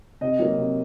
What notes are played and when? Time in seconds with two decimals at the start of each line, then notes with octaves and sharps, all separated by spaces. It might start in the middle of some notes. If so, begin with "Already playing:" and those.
0.21 C3 D#5
0.39 F#3 A#3
0.58 C3